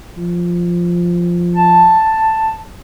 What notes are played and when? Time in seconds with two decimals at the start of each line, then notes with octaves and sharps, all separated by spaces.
0.18 F3
1.56 A5